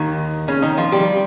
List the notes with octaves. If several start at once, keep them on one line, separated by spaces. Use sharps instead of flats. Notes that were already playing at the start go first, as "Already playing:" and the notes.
Already playing: D#2 D#3
C#3 C#4
D#3 D#4
F3 F4
G3 G4